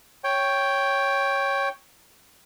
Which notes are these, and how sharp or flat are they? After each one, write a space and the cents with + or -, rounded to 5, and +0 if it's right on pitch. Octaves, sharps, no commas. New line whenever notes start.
C#5 +0 G5 +0